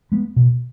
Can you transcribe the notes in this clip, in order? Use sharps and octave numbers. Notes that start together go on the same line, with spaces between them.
G#3 B3
B2